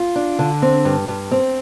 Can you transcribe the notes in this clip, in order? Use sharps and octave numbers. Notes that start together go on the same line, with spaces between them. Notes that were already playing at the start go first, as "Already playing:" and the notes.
Already playing: F4
D4
D3
C4
G2
G2
C4